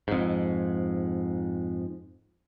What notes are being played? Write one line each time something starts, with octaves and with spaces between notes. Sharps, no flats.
F2 G#2